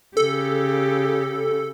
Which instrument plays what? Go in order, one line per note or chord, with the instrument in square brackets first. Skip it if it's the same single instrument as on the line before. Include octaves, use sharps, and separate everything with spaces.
[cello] C#3 G4 [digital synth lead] A4